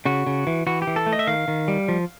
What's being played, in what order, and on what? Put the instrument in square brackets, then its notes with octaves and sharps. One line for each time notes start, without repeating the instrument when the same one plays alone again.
[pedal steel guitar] C#3 F#4
C#3
E3
E3 F#4
G4
E3
A4
A3
D#5
E5
D#3 F5
D#3
G3
F3